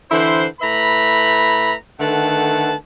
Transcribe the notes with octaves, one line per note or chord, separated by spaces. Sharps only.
D3 E3 E4 B4 C5
A2 B4 E5 A#5 B5
D3 D#3 A3 B4 F#5 A5